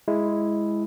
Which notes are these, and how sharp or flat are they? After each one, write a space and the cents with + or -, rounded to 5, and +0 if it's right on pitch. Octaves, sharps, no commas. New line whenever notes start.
G#3 +0 E4 +0